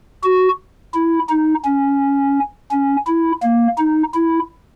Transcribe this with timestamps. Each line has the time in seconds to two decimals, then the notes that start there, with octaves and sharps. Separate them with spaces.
0.24 F#4
0.94 E4
1.30 D#4
1.65 C#4
2.71 C#4
3.07 E4
3.43 A#3
3.78 D#4
4.14 E4